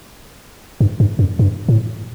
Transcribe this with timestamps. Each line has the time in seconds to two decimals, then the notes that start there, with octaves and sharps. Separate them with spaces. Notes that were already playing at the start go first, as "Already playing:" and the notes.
0.81 G2
1.00 G2
1.19 F#2
1.39 G2
1.69 A2